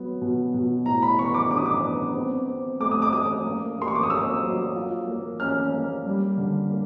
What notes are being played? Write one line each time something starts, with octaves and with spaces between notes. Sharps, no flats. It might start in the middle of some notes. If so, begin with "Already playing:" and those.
Already playing: F#3 B3
B2
B2
A2 A#5
B5
B3 C#6
D6
D4 D6
D#6
D6
B3
C4
C4
A3 D6
D#6
D6
A3 D#6
A#3
A#3 C6
C#6
D6
D#6
A#3 E6
F#3
F4
A#3
C#4 F6
A#3
G3
D3
A#3